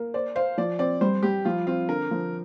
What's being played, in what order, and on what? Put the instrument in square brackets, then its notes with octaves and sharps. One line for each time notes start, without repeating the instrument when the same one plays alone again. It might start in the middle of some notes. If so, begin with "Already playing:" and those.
Already playing: [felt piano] A#3
[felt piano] C5 [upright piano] D5
[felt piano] C5 [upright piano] F5
[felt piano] F3 [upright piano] D5
[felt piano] C4 [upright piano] D5
[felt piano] G3 [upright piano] C5
[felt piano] G3 [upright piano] G4
[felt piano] F3 [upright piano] F4
[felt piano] C4 [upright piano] F4
[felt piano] D3 [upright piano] A#4
[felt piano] F3